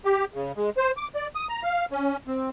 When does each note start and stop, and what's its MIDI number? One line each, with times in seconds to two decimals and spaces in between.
0.05 0.25 67
0.34 0.52 49
0.57 0.70 56
0.77 0.91 72
0.97 1.08 86
1.15 1.27 74
1.35 1.47 87
1.49 1.63 82
1.63 1.86 77
1.91 2.17 61
2.27 2.50 60